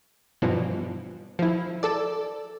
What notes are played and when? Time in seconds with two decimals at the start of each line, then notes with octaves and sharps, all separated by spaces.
0.42 G2 B2 E3 F3
1.39 F3 E4
1.83 A4 D5